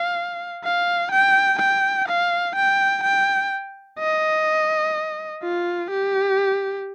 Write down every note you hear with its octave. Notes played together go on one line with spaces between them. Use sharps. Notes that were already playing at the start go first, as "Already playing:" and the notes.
Already playing: F5
F5
G5
G5
F5
G5
G5
D#5
F4
G4